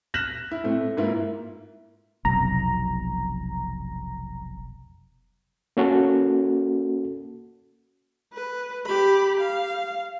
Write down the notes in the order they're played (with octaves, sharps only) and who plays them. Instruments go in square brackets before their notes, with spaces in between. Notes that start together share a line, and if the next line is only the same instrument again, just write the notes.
[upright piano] F6 F#6 A#6 B6 E7 F#7
E4
A2 A3 C4
G#2 A#3 E4 F4
[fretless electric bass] F1 B1 [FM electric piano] A#5
[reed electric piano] A#3 C#4 F#4 A4
[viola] B4
G4 B5
F5